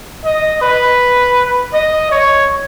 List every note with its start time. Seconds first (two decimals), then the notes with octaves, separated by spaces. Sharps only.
0.25 D#5
0.62 B4
1.74 D#5
2.11 C#5